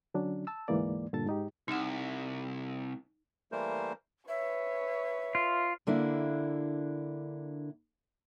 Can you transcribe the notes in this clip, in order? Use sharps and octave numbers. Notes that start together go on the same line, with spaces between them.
D3 F#3 C#4 D4
A5 E6
D2 G#2 E3 G#3 A#3 D5
G2 A#2 D3 A4 A5 A6
G#2 D#4 G4
C2 D#4 F#5
E3 G3 A3 A#3 A#4 C5
B4 C#5 E5
F4
D3 A#3 D4 E4